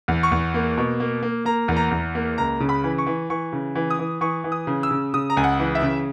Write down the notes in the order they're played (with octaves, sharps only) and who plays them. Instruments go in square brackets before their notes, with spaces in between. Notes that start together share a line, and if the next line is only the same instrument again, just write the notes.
[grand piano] E2
C#6
E2
A#3
B2
A#3
A#3
A#3 A#5
E2
A#5
E2
A#3
C#2 A#5
C#3
B5
E3
C#6
E3
E3 C#6
C#3
E3
D#6
E3
E3 C#6
E3
D#6
C#3
E6
C#3
C#3 D#6
A#5
C#2 G#5
F#5
E3
E5
C#3